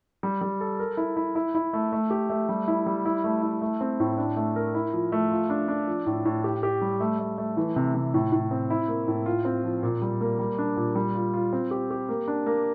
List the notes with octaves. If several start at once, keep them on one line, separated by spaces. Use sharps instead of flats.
G3
G3
A4
A#4
E4
E4
E4
E4
A3
A3
G4
A3
G3
E4
G3
E4
A3
E4
A3
C4
A2
D4
A3
A#4
E4
F3
A3
F4
D4
D4
F3
A2
A2
G4
G4
G3
A3
A3
A3
E3
C3
C3
A2
A2
C4
E4
A#3
A2
F4
C4
F3
A#2
G3
A#3
G3
D4
A#2
G3
F4
F4
C4
G4
G4
A#3
D4
A#3